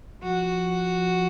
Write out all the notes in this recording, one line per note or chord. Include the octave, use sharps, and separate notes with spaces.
F3 F#4